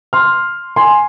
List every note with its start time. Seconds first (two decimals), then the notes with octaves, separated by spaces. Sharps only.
0.13 C6 F6
0.76 G#5 C6